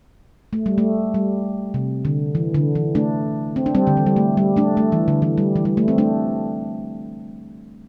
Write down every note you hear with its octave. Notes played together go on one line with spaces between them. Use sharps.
A3
G3
A3
G3
C3
D3
E3
D3
E3
A3 D4
C4
D4
G3 C4
D3
E3
G3
A3
G3
A3 D4
A3
E3
D3
E3
G3
E3
G3
A3
C4
A3 D4